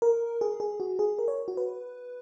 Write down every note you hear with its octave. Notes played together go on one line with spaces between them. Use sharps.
A#4
G#4
G#4
F#4
G#4
A#4
C#5
F#4
B4